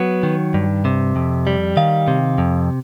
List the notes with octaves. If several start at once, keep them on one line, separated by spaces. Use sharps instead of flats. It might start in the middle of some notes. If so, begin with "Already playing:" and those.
Already playing: F#3 B3
D#3
G2
C3
F2
G3
D#3 F5
C3
F2